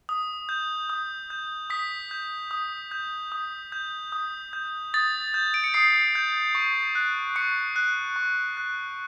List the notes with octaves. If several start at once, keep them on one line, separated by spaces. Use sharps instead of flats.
D#6
G6
D#6
G6
D#6 B6
G6
D#6
G6
D#6
G6
D#6
G6
D#6 A6
G6
D7
C#7
D#6 C7
G6
C#6
F#6
C#6 C#7
F#6
C#6
F#6